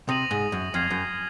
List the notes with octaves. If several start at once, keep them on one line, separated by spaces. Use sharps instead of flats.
C3 D#6 A#6 D#7 F#7
G#2
F#2
F2 F6 G#6 C7 F7
F#2